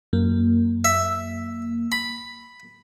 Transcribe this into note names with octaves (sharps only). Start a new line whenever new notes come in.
F#2 A#3
E5
B5